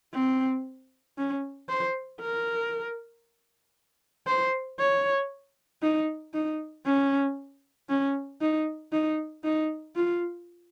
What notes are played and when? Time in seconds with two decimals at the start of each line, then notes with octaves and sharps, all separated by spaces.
0.14 C4
1.18 C#4
1.69 C5
2.21 A#4
4.27 C5
4.79 C#5
5.82 D#4
6.34 D#4
6.86 C#4
7.89 C#4
8.41 D#4
8.92 D#4
9.44 D#4
9.96 F4